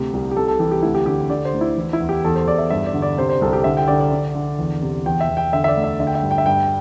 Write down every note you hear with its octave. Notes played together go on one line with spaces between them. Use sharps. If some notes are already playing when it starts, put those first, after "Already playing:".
Already playing: D2 C3 G4
C2
G4
C3 A4
A4
E3 G4
G4
D2 E4
G4
D3 G4
D3 D5
C5
D2
E4
E3
E4
E2
G4
E2 A4
C5
E2 D5
E5
G2 E5
D5
D3
D5
C3 C5
C5
C2 A4
G4
D3 E5
G5
D3 D5
D5
D3
D3
E2
C3
E2 G5
E5
E2
G5
D3 E5
E5
D5
D2
E5
D3 E5
G5
E5
G2
G5
E5
G2 G5